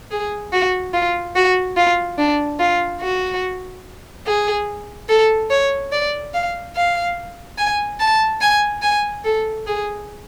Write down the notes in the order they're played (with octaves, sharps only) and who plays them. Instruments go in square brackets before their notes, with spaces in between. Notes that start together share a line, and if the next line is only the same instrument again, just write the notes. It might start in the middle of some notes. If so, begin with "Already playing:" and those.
[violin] G#4
F#4
F4
F#4
F4
D4
F4
F#4
G#4
A4
C#5
D5
F5
F5
G#5
A5
G#5
G#5
A4
G#4